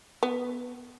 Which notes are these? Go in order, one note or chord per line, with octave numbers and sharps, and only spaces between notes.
B3